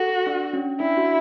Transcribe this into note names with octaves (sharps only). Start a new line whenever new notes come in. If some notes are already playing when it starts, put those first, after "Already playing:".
Already playing: F#4 A4
D4
C#4
D4 E4
F#4